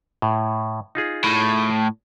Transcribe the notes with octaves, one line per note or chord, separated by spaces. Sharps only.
A2
D#4 F4 G#4
A2